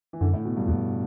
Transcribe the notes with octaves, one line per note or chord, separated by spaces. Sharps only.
E3
F#2 D3
A2
B2
G2
E2 B2